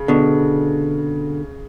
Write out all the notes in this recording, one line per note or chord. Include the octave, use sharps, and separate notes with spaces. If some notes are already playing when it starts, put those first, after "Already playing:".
Already playing: C#3
B2 D3